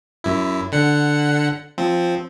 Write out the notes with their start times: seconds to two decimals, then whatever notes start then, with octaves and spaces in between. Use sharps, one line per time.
0.24 F#2 E4
0.72 D3 F#5 C#7
1.78 F3 C4